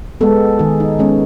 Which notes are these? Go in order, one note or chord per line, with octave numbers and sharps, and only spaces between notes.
G#3 B3 A4
D#3 G#4
D#4
G#3 B3 C#4